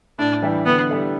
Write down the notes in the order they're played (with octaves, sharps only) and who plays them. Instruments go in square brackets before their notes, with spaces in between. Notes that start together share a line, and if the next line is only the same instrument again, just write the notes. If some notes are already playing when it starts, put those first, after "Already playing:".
[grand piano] A2 [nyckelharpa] D4
[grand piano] E3 G3 E4 G4
[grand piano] D3 [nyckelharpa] B3
[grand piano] G3 E4 A4